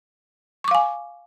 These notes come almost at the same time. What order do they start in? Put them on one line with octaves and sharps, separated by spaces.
C#6 D6 F5 G#5